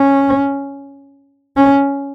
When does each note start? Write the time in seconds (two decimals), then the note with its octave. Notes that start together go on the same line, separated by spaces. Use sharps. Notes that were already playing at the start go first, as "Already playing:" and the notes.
Already playing: C#4
1.57 C#4